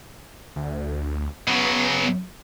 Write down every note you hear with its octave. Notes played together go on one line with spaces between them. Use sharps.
D2
C#3 F#3 B3